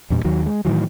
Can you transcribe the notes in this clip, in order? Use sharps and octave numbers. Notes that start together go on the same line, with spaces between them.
E2 G2 A#2
D#2 D#3 F#3
G#3
A2 D#3 E3 F#3